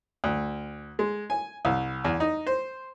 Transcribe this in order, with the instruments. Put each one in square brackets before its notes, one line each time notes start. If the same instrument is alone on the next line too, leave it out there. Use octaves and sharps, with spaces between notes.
[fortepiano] D2
G#3
G#5
C2
E2
D#4
C5